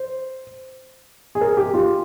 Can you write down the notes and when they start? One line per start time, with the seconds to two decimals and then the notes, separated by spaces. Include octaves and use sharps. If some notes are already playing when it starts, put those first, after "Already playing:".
Already playing: C5
1.35 G#4
1.41 A#4
1.57 G4
1.74 F4